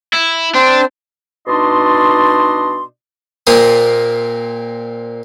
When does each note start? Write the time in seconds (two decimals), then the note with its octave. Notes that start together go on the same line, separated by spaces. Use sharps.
0.14 E4
0.55 C4 D4 C5
1.47 B2 D4 D#4 D5 D#5 C6
3.47 A#2 A#3 C4 D#6